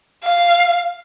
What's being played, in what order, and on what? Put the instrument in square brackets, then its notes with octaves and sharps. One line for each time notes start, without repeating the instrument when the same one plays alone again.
[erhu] F5